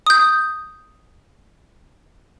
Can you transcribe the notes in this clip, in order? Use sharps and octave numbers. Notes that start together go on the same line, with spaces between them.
D#6 G6